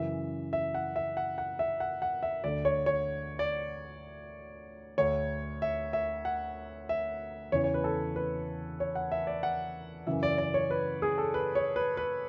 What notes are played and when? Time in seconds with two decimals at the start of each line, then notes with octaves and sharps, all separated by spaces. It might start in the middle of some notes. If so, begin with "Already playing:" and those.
Already playing: F#2 C#3 E3 E5
0.53 E5
0.74 F#5
0.96 E5
1.17 F#5
1.38 F#5
1.59 E5
1.80 F#5
2.02 F#5
2.23 E5
2.44 D2 D3 D5
2.65 C#5
2.86 C#5
3.39 D5
4.98 D2 D3 C#5
5.62 E5
5.93 E5
6.25 F#5
6.89 E5
7.52 E2 C#3 E3 C#5
7.64 C#5
7.74 B4
7.84 A4
8.16 B4
8.80 C#5
8.95 F#5
9.12 E5
9.27 D5
9.43 F#5
10.07 F#2 C#3 E3 E5
10.23 D5
10.38 D5
10.54 C#5
10.71 B4
11.02 G#4
11.18 A4
11.34 B4
11.55 C#5
11.76 B4
11.97 B4